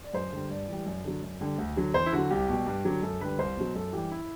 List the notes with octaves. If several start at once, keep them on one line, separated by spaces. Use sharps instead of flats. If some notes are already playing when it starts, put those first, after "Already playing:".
D5
F#2 C5
D3 G3
G2 D5
E3 G3
F#2
D3 F#3
F#2
D3 G3
D2
D3 F#3
E2 C5
E4
D3 F#3 F#4
C2 G4
B2 G3
G2
D3 F#3
F#2 A4
D3 G3 B4
C2 C5
B2 F#3
F#2 A4
E3 G3 G4
E4